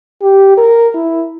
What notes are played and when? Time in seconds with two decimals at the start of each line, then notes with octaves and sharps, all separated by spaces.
0.22 G4
0.58 A#4
0.94 E4